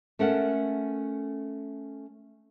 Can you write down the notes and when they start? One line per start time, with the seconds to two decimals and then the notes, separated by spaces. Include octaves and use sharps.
0.19 A3 C#4 A4 A#4 F#5